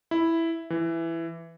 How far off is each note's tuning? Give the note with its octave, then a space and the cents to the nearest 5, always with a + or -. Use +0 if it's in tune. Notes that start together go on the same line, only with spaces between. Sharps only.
E4 +0
E3 +10